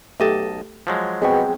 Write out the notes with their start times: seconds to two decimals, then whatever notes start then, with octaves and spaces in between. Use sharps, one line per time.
0.20 B1 A3 G4 A4 D#5 A5
0.87 F3 F#3 G#3
1.22 B2 B3 C4 G#4 G5 C#6